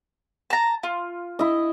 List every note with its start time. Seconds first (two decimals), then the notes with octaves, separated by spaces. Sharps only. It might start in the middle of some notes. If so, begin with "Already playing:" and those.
0.50 A5 A#5
0.83 F4
1.39 E4 D#5